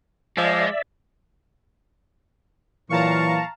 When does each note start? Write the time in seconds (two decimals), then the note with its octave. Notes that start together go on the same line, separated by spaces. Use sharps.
0.37 F3 G#3 D5 E5
2.91 A#2 E3 F#3 F5 A5 A#5 C#6